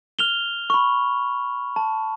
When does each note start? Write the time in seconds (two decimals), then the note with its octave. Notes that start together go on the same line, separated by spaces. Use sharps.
0.19 F6 F7 G7
0.70 B5 C#6
1.76 A5